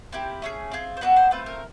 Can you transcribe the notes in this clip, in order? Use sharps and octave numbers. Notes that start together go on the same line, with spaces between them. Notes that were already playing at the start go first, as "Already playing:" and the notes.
C4 E4 G4 A#4
A3 C#4 E4 G#4
C4 F4 G#4
C5
B3 D4 F#4 A4 B4
C5
A3 C4 F4 B4
A#4